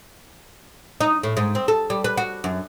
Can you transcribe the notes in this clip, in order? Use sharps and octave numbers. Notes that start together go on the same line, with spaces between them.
D#4
A2
G#2
C4
A4
G3
B4
F#4
F#2